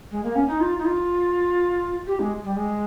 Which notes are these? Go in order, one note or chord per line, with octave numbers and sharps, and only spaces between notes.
G#3
A#3
C#4
D#4
F4
D#4
F4
G4
G#3
G3
G#3